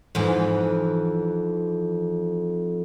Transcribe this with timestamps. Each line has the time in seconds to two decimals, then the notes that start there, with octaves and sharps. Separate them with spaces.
0.15 F2 G#2 E3